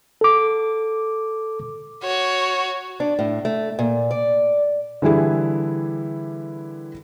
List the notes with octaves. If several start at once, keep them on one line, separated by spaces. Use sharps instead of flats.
A4 D6
F#4 C#5
D4
A2
A3
A#2
D5
D3 E3 G3 E4 G#4